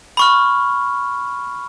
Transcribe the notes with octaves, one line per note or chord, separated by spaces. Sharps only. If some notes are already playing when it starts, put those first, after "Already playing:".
B5 C#6 F6